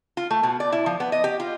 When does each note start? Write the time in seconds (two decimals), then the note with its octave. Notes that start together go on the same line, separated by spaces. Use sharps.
0.17 F4
0.31 A3
0.43 B2
0.60 D5
0.72 E4
0.86 F3
1.00 B3
1.12 D#5
1.24 G4
1.40 F4